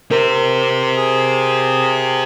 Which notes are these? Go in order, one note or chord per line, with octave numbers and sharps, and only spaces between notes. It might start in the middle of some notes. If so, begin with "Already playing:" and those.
G4 A#4 C5
G#4